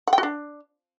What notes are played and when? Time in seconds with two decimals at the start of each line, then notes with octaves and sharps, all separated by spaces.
0.08 F#5
0.13 G5
0.18 F#4
0.23 D4